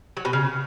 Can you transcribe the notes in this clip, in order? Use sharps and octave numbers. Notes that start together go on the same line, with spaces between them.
F#3
B2
C#3